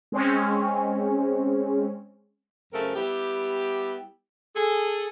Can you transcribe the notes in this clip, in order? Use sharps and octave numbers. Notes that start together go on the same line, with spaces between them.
G#3 C4 C#4
F#2 C#3 A3 C4 A4 A#4
G3 B3 E4 G4
G#4 A4